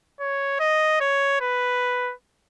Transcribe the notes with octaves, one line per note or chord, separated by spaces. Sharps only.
C#5
D#5
C#5
B4